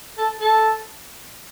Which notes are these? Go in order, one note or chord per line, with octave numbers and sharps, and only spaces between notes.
A4
A4